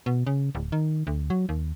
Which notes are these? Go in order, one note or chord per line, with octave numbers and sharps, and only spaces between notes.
B2
C#3
D1
D#3
D2
F#3
D#2